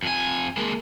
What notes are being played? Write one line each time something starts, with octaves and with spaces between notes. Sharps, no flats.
F2 G#5
G#3 A#3